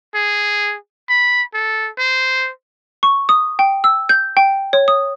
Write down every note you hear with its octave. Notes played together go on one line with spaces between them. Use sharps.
G#4
B5
A4
C5
C#6
D#6
G5
E6
G6
G5
C#5
D#6